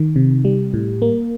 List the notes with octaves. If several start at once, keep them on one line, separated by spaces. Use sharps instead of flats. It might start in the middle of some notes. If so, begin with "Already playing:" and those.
Already playing: D#3
C3
G3
A2
A#3